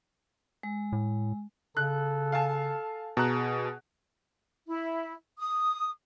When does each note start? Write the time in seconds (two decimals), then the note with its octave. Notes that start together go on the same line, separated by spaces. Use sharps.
0.63 G#3
0.92 A2
1.77 C#3 A4 F#6
2.32 F5 G#5 A5
3.17 B2 G#4 A5 A#5 F#6
4.67 E4
5.39 D#6